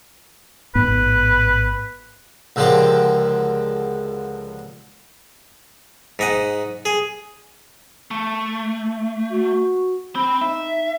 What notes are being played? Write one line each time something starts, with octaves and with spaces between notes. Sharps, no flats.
A1 G#2 B3 B4
C#2 D3 F3 A#3 C4 G4
G#2 D#5 F#5
G#4
A3
F#4
C4 B5
D#4 E5